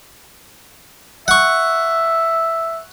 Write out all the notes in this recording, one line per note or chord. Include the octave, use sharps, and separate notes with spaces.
E5 F#5 C#6